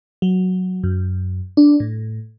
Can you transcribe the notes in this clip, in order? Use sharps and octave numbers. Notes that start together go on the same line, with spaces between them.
F#3
F#2
D4
A2